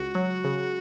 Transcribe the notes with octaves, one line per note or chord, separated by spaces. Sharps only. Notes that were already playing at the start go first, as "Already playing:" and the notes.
Already playing: C#2 F#4
F#3
C#3